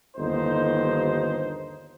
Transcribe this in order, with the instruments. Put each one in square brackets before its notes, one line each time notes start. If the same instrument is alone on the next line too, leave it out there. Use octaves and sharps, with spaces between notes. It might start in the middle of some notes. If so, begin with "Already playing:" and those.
[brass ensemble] G1 D#2 D#4 C5